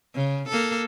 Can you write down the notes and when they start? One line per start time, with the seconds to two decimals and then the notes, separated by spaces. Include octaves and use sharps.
0.15 C#3
0.49 A#3 A4